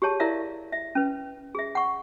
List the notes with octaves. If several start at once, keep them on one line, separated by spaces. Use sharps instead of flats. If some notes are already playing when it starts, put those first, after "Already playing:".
G4 G#4 C#5 A5
E4 A#4 D5 E5 F5
E5
C#4 B4
G#4 E5
F#5 C#6